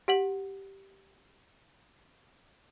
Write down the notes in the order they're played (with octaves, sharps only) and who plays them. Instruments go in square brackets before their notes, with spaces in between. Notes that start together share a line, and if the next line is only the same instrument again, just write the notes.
[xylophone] G4 F#5 F#7